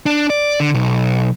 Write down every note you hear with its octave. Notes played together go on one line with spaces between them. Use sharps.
D4
D5
D3
B1